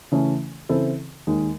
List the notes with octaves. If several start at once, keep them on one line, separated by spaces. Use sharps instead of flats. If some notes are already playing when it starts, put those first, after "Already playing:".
C#3 E3 A3 C#4
C#3 E3 C4 E4 A4
D#2 D#3 G#3